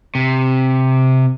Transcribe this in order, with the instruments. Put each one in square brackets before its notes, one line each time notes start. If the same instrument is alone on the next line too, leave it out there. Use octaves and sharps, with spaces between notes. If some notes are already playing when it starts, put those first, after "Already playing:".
[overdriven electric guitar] C3